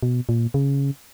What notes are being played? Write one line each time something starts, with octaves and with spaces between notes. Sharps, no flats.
B2
A#2
C#3